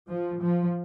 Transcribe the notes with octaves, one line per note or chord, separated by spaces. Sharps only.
F3
F3